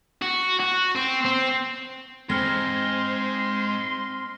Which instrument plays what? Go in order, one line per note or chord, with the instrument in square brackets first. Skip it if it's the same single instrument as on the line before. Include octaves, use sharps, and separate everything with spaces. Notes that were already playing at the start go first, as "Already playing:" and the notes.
[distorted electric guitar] F#4
F#4
C4
C4
[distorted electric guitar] G#2 [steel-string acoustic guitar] C4 [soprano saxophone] C6 [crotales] F6 A#6